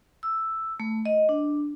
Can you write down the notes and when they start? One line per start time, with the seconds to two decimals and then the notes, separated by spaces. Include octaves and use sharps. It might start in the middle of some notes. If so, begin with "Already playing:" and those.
0.23 E6
0.80 A3
1.06 D#5
1.29 D4